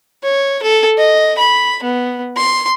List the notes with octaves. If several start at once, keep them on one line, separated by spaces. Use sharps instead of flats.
C#5
A4
D#5
B5
B3
C6